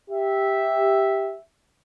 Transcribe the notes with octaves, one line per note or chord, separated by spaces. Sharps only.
G4 E5